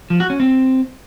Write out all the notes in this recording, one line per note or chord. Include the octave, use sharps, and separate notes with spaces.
F3
F#4
C#4
C4